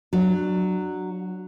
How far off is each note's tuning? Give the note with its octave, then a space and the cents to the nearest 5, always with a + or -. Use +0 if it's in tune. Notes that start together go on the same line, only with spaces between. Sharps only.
F#3 +0 D4 +20